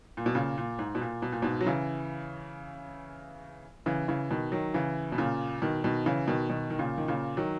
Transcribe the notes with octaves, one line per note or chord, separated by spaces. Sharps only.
A#2
B2
A#2 C#3
A#2
G#2
B2
A#2
B2
A#2
G#2 B2
F#3
C#3 E3
C#3 E3
C#3 E3
B2 D#3
D#3 F#3
C#3 E3
B2
A#2 C#3
B2 D#3
B2 D#3
C#3 E3
B2 D#3
B2 D#3
D#3
A#2 C#3
D#3
A#2 C#3
D#3 F#3